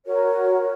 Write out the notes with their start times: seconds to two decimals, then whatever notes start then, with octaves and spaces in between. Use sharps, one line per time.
0.06 F#4 A#4 C#5